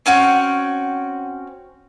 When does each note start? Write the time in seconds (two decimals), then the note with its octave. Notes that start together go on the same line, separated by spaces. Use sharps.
0.06 C4 C#4 F#4 G5